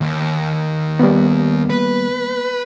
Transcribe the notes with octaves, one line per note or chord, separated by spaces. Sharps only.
D#2
G3 A#3 B3
B4